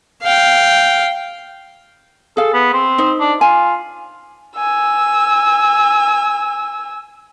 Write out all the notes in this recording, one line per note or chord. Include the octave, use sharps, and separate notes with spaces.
F5 G5
G#4 A4 F5
B3
C4
D#4 C5
D4
F4 G#5
G#5 E6